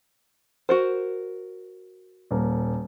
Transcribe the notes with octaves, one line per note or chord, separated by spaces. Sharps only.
F#4 A#4 C5
D#1 A#3